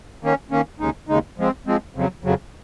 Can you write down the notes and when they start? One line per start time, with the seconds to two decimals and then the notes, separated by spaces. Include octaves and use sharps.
0.23 D#3 A#3 C#4
0.51 D#3 A#3 C#4
0.80 D#2 C#3 G#3 D#4
1.09 D#2 C#3 G#3 D#4
1.38 F3 G#3 C4
1.67 F3 G#3 C4
1.95 F2 C#3 F#3
2.24 F2 C#3 F#3